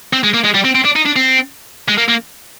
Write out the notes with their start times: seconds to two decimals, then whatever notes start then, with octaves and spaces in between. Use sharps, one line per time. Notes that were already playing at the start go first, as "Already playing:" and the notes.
0.13 C4
0.24 G#3
0.34 A#3
0.44 G#3
0.54 G3
0.65 C4
0.75 C4
0.85 D4
0.96 D#4
1.06 D4
1.16 C4
1.88 G#3
1.98 A#3
2.08 A#3